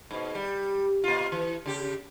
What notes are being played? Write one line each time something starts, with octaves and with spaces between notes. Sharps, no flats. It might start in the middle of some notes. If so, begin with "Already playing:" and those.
G#2 B2
G3
A#2 F4
E3
C#3 G4